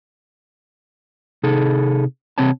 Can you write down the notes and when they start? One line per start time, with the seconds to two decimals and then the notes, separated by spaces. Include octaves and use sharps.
1.43 C3 D#4 G#4 A4
2.38 C3 C4 C#5 A5